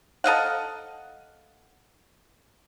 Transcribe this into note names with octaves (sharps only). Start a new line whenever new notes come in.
A4 D#5 F5 F#5